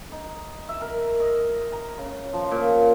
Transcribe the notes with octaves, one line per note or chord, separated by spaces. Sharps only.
D#4
E5
A#4
D#5
A#5
C#3
F3
A#2